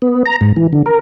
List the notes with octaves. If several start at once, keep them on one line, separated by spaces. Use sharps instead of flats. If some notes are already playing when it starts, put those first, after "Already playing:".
B3
A#5
G#2
E3
D3
A#4